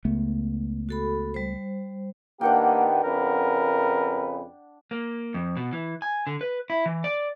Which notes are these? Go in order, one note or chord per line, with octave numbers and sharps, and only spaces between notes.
C#2 A3 B3
F#4 A4 B5
G3 C5
D#3 A#3 B3 D4 G4 F#5 G5
F2 C#3 A#4 B4
A#3
F2
B2
E3
G#5
D3
B4
E4
E3
D5